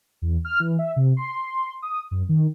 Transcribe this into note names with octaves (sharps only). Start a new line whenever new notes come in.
E2
F6
E3
E5
C3
C6
D#6
F#2
D#3